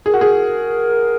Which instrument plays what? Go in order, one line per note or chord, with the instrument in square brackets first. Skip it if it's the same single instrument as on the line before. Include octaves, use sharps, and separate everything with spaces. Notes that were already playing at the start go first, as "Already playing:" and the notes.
[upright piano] G#4 [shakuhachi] A#4
[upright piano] F#4
G#4